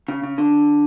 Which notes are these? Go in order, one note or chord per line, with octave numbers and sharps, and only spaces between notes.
C#3
C#3
D3